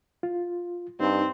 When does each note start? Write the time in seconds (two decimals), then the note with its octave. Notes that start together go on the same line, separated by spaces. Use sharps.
0.23 F4
1.00 G2 C4 D#4